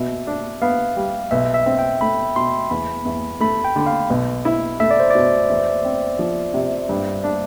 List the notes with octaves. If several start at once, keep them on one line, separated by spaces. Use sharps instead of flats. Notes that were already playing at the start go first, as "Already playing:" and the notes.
Already playing: B2 E5
D4
B3 F5
G3
B1 E5
E5
C4
G5
A3 B5
B2 C6
E2 B5
E2
A3 B5
G5
D3
F5
B1
E4
A3 E5
D5
C5
B2 D5
E2
C4
F3
C3
G2
D4